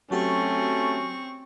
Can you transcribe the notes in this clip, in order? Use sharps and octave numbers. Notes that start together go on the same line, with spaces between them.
F#3 A3 C4 C#4 F#4 G4 C#6